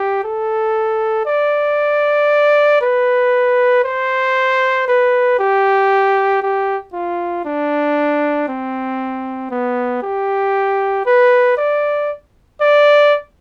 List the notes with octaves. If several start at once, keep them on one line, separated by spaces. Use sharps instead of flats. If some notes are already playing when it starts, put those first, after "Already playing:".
Already playing: G4
A4
D5
B4
C5
B4
G4
G4
F4
D4
C4
B3
G4
B4
D5
D5